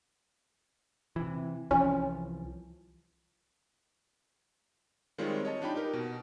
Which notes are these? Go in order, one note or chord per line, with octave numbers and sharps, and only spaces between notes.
C3 E3
C2 E3 F3 C#4
D#3 G3 G#3 C4 F4 C#5
C#5 D#5 A5
D4 D#4 F4 G4 G5 B5
D#4 G4 A#4 B4
B2